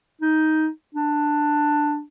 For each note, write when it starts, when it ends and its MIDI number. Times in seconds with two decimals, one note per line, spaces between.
0.22 0.67 63
0.95 2.01 62